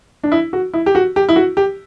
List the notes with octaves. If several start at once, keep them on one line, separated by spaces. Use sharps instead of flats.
D4
E4
F#4
E4
G4
F#4
G4
E4
F#4
G4